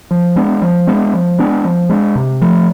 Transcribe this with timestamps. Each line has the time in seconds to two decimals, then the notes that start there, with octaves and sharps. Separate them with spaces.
0.11 F3
0.36 G#3 B3 D4
0.62 F3
0.87 G#3 B3 D4
1.14 F3
1.39 G#3 B3 D4
1.65 F3
1.89 G#3 B3 D4
2.16 C3
2.42 F3 A3